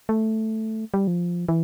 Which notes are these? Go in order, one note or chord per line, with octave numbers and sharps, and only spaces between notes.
A3
G3
F3
E3